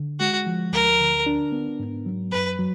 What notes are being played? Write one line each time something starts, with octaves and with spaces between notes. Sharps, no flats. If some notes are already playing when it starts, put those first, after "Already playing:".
Already playing: D3
G#3 F#4
F3
D2 A#4
D3
D4
B3
G#2
F#3
F#2 B4
F#3